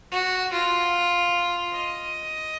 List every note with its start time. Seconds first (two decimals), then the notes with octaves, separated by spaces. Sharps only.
0.12 F#4
0.53 F4
1.73 D#5